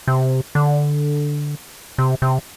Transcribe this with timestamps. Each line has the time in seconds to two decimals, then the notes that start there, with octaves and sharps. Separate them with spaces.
0.08 C3
0.55 D3
1.98 C3
2.22 C3